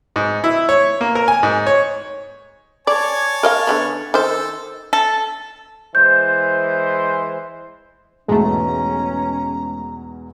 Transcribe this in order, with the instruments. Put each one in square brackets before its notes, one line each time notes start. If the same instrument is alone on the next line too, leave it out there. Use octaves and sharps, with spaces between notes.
[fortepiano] G#2
E4
C#5
A#3
A#4
G#5
G#2
C#5
[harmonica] C#5 G#5 A5 [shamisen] D5
[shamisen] A#4 D#5 F5
D3 G3 B3
[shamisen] D#3 C5 [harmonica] A4
[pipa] A4
[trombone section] E3 G#3 C5 [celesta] G6
[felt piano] E2 G#2 B2 [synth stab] G#3 A3 [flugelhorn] C#4 [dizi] A#5